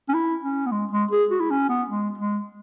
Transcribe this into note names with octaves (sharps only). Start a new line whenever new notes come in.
C#4
E4
C#4
B3
G#3
G#3
G#4
F#4
E4
C#4
B3
G#3
G#3